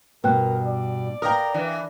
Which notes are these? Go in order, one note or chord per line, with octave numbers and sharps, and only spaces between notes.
G2 B2 A#4 B4 G5 F#6
D5
A#4 B4 F5 G5 D#6
E3 D4